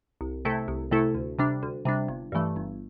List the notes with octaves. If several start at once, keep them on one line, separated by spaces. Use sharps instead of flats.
C2
C3 A3 E4 A4
C2
C3 A3 E4 A4
D2
C3 G3 D4
D2
C3 G3 D4
G1
G2 E3 A3
G1